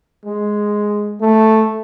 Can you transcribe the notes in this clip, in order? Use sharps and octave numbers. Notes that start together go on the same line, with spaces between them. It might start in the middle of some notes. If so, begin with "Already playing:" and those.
G#3
A3